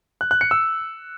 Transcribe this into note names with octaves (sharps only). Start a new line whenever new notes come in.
F#6
F#6
C#7
E6